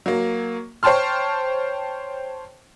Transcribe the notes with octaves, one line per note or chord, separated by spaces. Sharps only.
F#3 A#3
C5 C#5 G5 A5 C6 F6